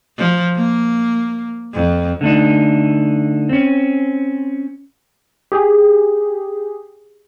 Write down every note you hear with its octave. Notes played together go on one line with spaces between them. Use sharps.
F3
A#3
F2
D3 A3 D4 D#4
C4 C#4
G4 G#4